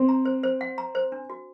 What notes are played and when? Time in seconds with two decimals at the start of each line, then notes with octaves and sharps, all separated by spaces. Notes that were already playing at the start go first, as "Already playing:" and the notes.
Already playing: C4
0.09 A#5
0.25 C5
0.43 C5
0.61 F#5
0.78 A#5
0.95 C5
1.12 D4
1.30 F#4